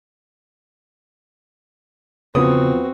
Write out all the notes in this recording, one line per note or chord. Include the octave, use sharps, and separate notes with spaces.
E2 C#3 F3 B3 C4 F#4 D#6